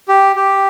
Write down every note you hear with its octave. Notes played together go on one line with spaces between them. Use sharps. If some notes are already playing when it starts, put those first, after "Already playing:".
G4
G4